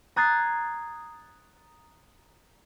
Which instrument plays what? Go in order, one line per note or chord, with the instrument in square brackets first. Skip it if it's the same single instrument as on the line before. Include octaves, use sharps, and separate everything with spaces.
[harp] A#5 D#6 F#6 G#6 A6 C7